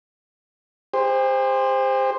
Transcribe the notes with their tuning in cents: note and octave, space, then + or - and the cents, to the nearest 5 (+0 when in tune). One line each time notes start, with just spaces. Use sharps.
G4 +45 C5 +0